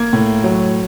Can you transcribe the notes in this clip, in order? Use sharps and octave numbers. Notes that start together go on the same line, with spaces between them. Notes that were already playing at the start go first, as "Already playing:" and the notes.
Already playing: A#3 G#6
A2
F#3